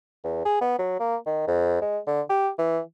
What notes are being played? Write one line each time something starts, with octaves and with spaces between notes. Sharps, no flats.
E2
G#4
B3
F#3
A#3
D#3
F2
G#3
D3
G4
E3